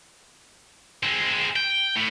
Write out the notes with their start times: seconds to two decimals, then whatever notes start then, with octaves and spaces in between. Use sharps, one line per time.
1.03 G#3 C4
1.56 G5
1.96 A2